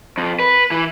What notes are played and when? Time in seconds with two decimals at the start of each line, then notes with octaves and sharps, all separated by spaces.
0.18 F2
0.40 B4
0.71 E3